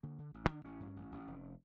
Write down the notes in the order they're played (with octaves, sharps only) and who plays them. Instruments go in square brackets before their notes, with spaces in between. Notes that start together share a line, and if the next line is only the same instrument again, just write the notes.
[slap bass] D3 A#3
D3
A1
D3 D4
A1 C#4
G2
A1
A1
F1